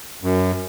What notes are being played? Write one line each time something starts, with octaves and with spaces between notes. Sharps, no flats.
F#2